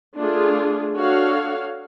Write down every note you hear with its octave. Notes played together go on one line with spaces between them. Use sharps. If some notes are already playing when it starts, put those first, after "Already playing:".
A3 D4 F4 G#4
D4 F#4 A4 C#5 F5